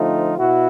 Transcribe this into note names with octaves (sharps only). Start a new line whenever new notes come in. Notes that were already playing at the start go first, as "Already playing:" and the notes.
Already playing: D3 F3 A3 C4 D#4 F4
B2 E4 F#4